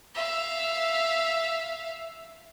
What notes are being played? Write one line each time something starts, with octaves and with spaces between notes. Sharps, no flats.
E5 F5